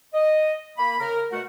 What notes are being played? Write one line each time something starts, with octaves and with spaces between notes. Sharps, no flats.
D#5
A#3 B5
C#3 A#4
B2 A3 F#4 A#4 F#5